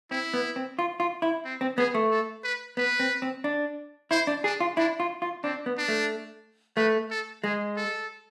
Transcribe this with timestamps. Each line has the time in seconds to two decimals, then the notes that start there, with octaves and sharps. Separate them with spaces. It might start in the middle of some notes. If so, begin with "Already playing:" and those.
0.11 C4 E4
0.34 B3
0.56 C4
0.79 F4
1.00 F4
1.22 E4
1.45 C4
1.61 C4
1.78 B3 G#4
1.94 A3
2.11 A4
2.44 B4
2.77 B3 B4
3.00 C4
3.22 C4
3.44 D4
4.11 E4 C5
4.27 D4
4.44 D4 G#4
4.60 F4
4.77 D4 E4
5.00 F4
5.22 F4
5.44 C4 D4
5.66 B3
5.78 D4
5.88 A3
6.77 A3 B4
7.11 A4
7.44 G#3 G#4
7.77 A4